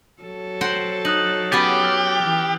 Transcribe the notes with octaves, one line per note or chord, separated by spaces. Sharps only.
F#3 A4
C5 F#5 G5 A#6 C7
D#4 D#6 F#6 F#7
B3 C#4 G4 G#4 A6
E6 F6 A6
E3